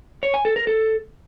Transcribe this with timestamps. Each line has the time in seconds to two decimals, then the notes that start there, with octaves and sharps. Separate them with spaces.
0.23 C#5
0.34 G#5
0.45 A4
0.56 A#4
0.67 A4